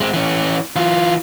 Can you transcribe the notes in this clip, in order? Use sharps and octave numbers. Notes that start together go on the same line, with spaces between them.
G#3 C4
E3 C#4
E3 F4